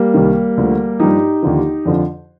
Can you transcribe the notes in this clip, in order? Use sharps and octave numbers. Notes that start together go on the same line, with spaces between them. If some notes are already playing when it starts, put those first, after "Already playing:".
Already playing: G3 A#3
C2 C3 D#3
D2 D3 F3
G2 F3 D#4 G4
D#2 D3 F3
F2 D3 F3